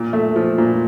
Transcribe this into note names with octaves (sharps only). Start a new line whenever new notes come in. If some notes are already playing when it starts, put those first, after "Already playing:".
Already playing: A#2
A3
F3
A#2